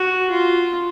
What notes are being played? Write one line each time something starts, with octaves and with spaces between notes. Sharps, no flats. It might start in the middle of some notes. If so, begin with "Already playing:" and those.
Already playing: F#4
F4